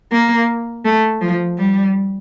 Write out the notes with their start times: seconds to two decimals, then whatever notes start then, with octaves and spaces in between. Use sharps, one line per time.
0.12 A#3
0.85 A3
1.21 F3
1.57 G3